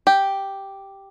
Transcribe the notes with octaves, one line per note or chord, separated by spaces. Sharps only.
G4